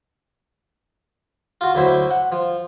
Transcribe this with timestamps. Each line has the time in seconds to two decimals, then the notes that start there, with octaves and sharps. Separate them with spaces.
1.61 F4 F#4
1.75 D2 F#3 E4 C5
2.11 F#5
2.32 F3